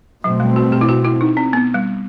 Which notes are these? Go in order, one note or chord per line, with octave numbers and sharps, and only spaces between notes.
B2 F#3 A3 C4
G3
F#4
G4
E4
F#4
E4
D#4
C4
B3
G3